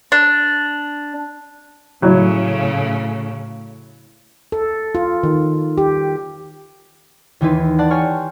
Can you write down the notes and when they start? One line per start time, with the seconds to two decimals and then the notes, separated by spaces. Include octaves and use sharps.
0.12 D4
2.02 A2 C#3 F#3 A3 E4
4.52 A4
4.95 F4
5.23 D#3
5.78 G4
7.41 D#2 E3 D#4 E4 B4 C6
7.78 D5 F#5 A5 C6
7.90 G4 C#5 G#5 C6 C#6 F6